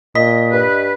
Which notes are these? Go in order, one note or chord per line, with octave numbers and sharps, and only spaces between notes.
A#2 D#5 B6
G2 B4